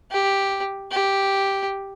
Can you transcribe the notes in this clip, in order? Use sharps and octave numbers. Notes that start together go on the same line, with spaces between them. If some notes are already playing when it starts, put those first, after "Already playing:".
G4
G4